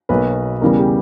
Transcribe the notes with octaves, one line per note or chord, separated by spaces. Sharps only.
B1 B2 F#3 A#3 B4
E2 C#3 E3 G3 B3 A#4
G4